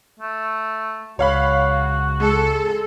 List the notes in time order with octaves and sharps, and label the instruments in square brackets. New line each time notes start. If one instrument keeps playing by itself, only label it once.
[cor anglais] A3
[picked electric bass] C#2 [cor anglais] F#4 [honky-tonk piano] C#5 F5 B5
[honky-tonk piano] G#3 [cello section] A4